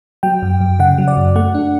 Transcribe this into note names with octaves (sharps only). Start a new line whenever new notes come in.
F#3 G5
F#2
F#2
C#3 F#5
F#3
D5
F#2
A3 F#5
D4